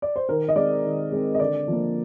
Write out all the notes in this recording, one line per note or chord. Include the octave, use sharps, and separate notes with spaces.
D5
C5
D#3 A#4
D#5
G#3 C4 D5
D#3
G#3 C4
D#5
D3 D5
F3 A#3